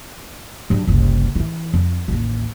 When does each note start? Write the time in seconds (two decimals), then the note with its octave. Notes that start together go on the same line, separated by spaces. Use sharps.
0.70 G2 F#3
0.87 F#1 C2
1.35 E3 E4
1.74 F2
2.08 A1 D#2